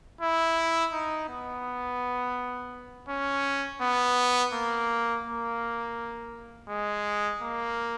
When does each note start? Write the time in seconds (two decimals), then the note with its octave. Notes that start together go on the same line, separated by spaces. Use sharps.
0.21 E4
0.92 D#4
1.29 B3
3.09 C#4
3.81 B3
4.53 A#3
5.25 A#3
6.69 G#3
7.42 A#3